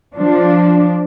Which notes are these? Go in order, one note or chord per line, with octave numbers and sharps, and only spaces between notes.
F3 D4